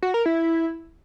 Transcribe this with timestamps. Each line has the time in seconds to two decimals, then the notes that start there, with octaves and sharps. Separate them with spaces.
0.02 F#4
0.14 A#4
0.26 E4